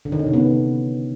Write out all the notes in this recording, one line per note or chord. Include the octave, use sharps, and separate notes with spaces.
D3
D#3
C#4
C3
B3